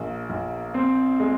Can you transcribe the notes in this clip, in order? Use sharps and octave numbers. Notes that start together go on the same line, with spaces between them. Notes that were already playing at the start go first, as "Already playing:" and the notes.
Already playing: A#1 A#3
A#1
C4
G#3